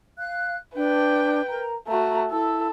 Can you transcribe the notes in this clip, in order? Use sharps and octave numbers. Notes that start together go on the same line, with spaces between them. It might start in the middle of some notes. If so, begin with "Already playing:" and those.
F5 F#6
D4 B4 G5
A#4 A#5
A3 F#4 A#5
E4 A4 E6